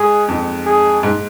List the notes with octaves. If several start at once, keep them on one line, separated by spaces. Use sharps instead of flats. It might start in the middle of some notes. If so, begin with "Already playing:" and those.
Already playing: G#2 G#4
F2
G#4
G#2